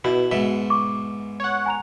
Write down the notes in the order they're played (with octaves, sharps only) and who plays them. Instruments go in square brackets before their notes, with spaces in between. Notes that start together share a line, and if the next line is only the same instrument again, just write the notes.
[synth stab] B2 [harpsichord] E4 [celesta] F#4
[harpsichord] G#2 B3 E5
[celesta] C#6 D6
[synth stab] C#5 F#5
[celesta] G#5 A#5 F7